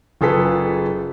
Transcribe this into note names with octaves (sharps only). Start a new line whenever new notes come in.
F#1 F4 G#4 A4 B4 B6